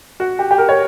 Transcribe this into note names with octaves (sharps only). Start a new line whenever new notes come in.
F#4
G4
G4
A#4
C#5